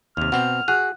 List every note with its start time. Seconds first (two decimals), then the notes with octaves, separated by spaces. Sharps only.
0.17 D#2 C3 F6
0.32 B2 C4 C5 F#5
0.68 F#4 G#4 F#6